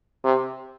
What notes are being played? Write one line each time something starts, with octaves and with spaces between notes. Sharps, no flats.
C3